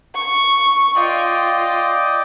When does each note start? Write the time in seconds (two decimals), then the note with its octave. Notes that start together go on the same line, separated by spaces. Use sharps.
0.14 C#6
0.96 F4 D5 D#5 G5